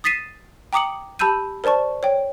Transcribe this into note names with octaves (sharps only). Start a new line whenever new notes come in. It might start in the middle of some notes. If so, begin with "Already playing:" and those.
D#6 A6 B6 C7 D#7 E7
G5 A#5 D6 D#6 C#7 F#7
G4 A5 B5 E6 G6 D#7
A#4 C5 D5 A5 C#6
C#5 G5